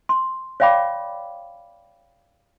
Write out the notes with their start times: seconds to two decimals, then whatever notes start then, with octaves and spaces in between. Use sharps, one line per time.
0.09 C6
0.60 C#5 D5 F5 G5 B5 D6